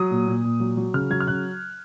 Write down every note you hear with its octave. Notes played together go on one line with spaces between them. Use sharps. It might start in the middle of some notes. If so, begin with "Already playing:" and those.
Already playing: F#3 D#6
A#2
A#2
A#2
F#3
F#3
C#3 F6
F#3 G#6
F6
C#3 F#6